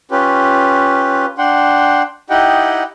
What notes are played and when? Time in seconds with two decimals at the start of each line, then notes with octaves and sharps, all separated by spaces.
0.11 C#4 F4 G4 B4
1.38 D4 F#5 G5 C6
2.30 D#4 E4 G4 D#5 F#5 G5